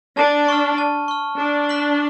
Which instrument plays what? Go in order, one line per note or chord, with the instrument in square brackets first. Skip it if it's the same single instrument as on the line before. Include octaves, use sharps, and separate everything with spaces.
[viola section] D4 [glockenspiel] A5
[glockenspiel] C#6 F6
A5
C#6 F6
[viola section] D4 [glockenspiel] D6
[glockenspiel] F#6 B6 D7 F#7